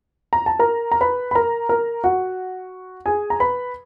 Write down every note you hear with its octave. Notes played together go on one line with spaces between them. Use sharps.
A#5
A5
A#4 A#5
A#5
B4 B5
B5
A#4 A#5
A#4 A#5
F#4 F#5
G#4 G#5
A#5
B4 B5